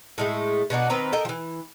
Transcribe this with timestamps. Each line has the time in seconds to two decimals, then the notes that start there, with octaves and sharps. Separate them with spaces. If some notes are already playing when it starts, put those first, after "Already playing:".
0.18 A2 G#3 A3
0.70 B2 D4 D#4 F#4
0.90 D#3 C4 B4 A#5
1.12 A4 A#4 D#5 G5
1.25 E3 F3